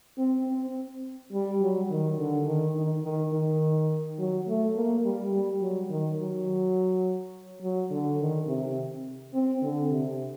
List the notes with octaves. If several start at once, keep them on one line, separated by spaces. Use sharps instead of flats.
C4
C4
G3
F#3
D#3
D3
D#3
D#3
D#3
D#3
F#3
A3
A#3
G3
G3
F#3
D#3
F#3
F#3
D3
D#3
C3
C4
D3
C3